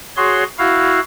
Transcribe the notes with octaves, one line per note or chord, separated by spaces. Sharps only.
F#4 G#4 C#5 C6
E4 F#4 F5